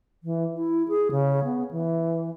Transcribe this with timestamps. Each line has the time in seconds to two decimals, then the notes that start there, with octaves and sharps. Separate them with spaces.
0.23 E3
0.55 E4
0.89 G#4
1.11 C#3
1.44 B3
1.71 E3